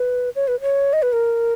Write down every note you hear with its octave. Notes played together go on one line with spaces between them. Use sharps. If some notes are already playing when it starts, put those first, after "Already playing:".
Already playing: B4
C#5
B4
C#5
D#5
B4
A#4